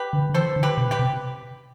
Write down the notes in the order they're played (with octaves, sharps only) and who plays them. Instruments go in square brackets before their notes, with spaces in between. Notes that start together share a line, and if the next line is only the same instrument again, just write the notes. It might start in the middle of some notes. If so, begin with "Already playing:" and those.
Already playing: [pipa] G4 B4
[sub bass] D3
D3
[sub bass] E3 [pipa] A4 C5
[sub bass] D3
[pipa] G4 B4
[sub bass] B2
[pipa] G4 B4
[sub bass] C3